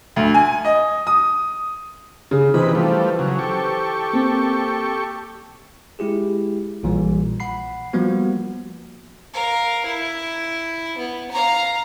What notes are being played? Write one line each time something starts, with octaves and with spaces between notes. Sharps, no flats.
D2
G#5
D#5
D#6
C#3
C3 E3 D#4 B4 C5 B5
F3 G3 A3
C#3 F#3
G4 A4 C#6
A#3 C4
G#3 E4 G4 G#4
A#1 A#2 E3 G3
F#5 B5 C7
F3 G3 A#3 B3 F#4
A#4 F5
E4
B3
F5 A#5